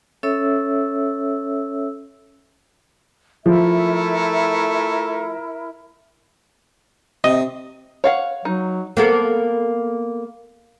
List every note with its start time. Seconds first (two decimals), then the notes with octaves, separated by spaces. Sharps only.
0.23 C#4 A4 C#5 E5 E6
3.46 F3 A3 E4 A#4 E5
7.24 C3 D#5
8.04 C#5 F5 F#5
8.45 F#3 D#4
8.97 A#3 B3 A4